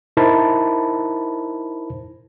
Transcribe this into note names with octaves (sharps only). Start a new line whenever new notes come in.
D#4 E4 A#4 C5 A5 B5